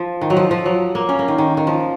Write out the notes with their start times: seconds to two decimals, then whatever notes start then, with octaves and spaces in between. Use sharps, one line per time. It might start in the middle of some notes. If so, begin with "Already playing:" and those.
Already playing: F3
0.21 D#3
0.30 F#3
0.37 F3
0.51 F3
0.66 F#3
0.95 A#3
1.09 C#4
1.19 A#3
1.28 D#3
1.38 D#3
1.57 D#3
1.67 F3